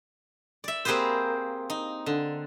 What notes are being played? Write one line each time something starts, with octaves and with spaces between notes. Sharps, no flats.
D5 E5
A#3 C4 G4 G#4 B4 C5
D#4
D3